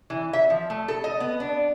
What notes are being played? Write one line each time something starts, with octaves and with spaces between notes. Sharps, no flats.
E3
E5
F3
A3
A4
D#5
B3
D4